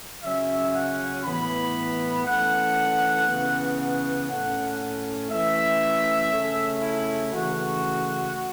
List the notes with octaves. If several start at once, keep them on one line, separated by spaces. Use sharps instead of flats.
C#3 F#3 C#4 E5
F#5
A2 E3 B3 B5
E3 A3 C#4 F#5
C#3 E3 B3
F#5
A2 A3 C#4 F#5
E3 A3 C#4 E5
C#3 A3 C#4
E4
C#3 E3 A3 F#4